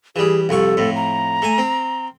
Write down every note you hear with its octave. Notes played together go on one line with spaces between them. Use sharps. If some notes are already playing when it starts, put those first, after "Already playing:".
E3 G3 G#4
C2 F2 A4 C#6
F2 A2
A#5
A3 G#5
C4